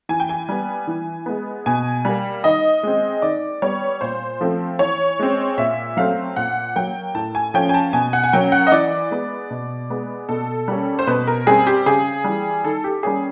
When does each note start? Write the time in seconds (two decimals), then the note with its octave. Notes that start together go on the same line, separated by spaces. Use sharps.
0.09 E3 G#5
0.20 G5
0.29 G#5
0.49 G3 B3
0.87 E3
1.26 G#3 B3
1.66 B2 G#5
2.05 G3 A#3
2.44 D#3 D#5
2.83 G#3 C4
3.22 D#3 D5
3.62 G3 B3 C#5
4.01 A#2 C5
4.41 F3 A3 C4
4.79 E3 C#5
5.19 G#3 C4
5.58 A#2 E5
5.97 F#3 A3 C4 F5
6.36 A#2 F#5
6.76 F#3 A#3 G5
7.14 A2 A5
7.35 G#5
7.54 F3 A3 C#4 G5
7.69 G#5
7.74 A5
7.93 B2 G#5
8.13 F#5
8.24 G#5
8.33 F#3 A#3 C#4 G5
8.52 F#5
8.67 D#5
8.72 E3 D5
9.11 G#3 B3
9.50 B2
9.90 G#3 B3
10.29 B2 A4
10.68 G3 A#3 C#4
10.99 C5
11.07 B2 B4
11.27 A#4
11.47 G3 C4 G#4
11.67 G4
11.86 C#3 G#4
12.24 E3 G3
12.64 D#3 A4
12.84 G4
13.03 G3 A#3 C#4 G#4